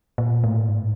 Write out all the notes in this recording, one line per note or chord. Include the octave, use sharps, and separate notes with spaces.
A#2
A2
G#2